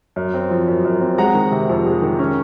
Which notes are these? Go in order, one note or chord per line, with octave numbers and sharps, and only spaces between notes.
F#2
C4
F3
F#2
F#2
C4
G#3 F#5 A#5
D#3
C3
F2
G#3
D#3
C#4